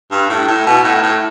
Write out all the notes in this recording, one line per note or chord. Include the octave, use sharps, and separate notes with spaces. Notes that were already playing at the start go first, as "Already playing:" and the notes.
G2
A2
A2
B2
A2
A2